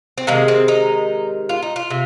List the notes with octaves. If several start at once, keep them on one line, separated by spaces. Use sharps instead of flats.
C4
C3 D#3 G#3 A#3
C4
D#4
F4
D#4
F4
C3